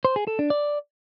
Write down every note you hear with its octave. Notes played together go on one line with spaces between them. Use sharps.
C5
G#4
A4
D4
D5